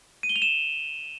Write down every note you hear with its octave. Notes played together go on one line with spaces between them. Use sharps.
D#7
G7
F7
E7